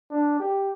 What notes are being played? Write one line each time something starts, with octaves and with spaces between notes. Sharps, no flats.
D4
G4